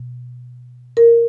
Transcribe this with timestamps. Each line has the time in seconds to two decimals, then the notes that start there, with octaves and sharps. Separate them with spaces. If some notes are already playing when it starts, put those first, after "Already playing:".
Already playing: B2
0.97 A#4